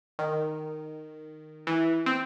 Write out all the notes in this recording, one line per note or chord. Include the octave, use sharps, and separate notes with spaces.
D#3
E3
C4